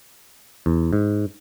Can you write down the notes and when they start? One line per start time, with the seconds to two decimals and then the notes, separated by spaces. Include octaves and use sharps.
0.66 E2
0.93 G#2